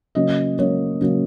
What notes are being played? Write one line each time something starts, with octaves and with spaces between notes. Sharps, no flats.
C#3 F#3 A#3 D#5
C#3 F#3 A#3 C#5
C#3 F#3 A#3